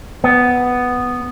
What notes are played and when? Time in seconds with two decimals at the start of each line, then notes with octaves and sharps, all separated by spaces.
0.24 B3